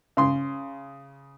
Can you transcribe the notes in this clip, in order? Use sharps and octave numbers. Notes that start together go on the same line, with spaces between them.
C#3 C6